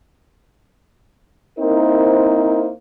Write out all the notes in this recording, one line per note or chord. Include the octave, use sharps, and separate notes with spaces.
A#3 C4 D#4 E4 A#4 C5